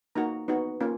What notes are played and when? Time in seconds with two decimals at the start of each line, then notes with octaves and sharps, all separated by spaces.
0.15 A#3 D#4 F#4 A#5
0.48 B3 D#4 F#4
0.81 A#3 C#4 F4